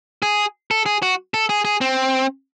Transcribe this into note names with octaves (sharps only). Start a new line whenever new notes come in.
G#4
A4
G#4
F#4
A4
G#4
G#4
C4